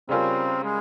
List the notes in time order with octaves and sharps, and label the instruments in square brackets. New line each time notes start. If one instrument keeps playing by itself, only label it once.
[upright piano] C#3 G3 C#4 F4 A#4 [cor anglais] C4
[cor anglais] G#3